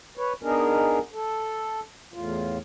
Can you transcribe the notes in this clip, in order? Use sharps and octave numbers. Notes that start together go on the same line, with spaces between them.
B4 C#5
B3 D4 D#4 G#4 A#4
A4
E2 A2 F4